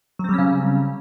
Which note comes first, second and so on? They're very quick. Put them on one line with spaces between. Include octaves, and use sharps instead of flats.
F#3 C4 G3 C#4 C#3